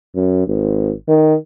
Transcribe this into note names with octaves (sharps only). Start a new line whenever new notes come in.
F#2
G#1
D#3